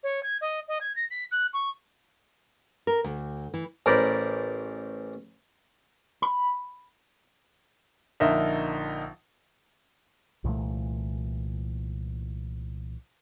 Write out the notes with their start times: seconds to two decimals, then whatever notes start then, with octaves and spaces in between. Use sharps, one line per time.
0.03 C#5
0.23 G#6
0.41 D#5
0.68 D#5
0.80 G#6
0.95 A#6
1.10 B6
1.31 F#6
1.53 C#6
2.87 A#4
3.04 D2
3.54 E3
3.86 A1 A#4 C5 D5 B5
6.22 B5
8.20 A#1 D3 D#4 A#4 E5
10.44 C2 A#2 E3 A3